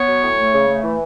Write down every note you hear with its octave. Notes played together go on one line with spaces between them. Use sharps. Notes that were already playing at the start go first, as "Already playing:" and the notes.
Already playing: B3 C#5
F#3
A2
A3
C#3
A3
E3